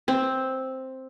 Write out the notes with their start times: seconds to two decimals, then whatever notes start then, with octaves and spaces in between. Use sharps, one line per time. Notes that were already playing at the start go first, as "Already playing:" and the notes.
0.08 C4